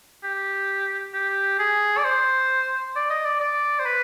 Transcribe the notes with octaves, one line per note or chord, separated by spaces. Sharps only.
G4
G4
G#4
D5
C5
D5
D#5
D5
D5
C5
B4